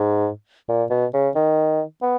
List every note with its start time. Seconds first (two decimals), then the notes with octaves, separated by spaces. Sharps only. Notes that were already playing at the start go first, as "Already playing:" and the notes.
Already playing: G#2
0.69 A#2
0.90 B2
1.14 C#3
1.35 D#3
2.02 B3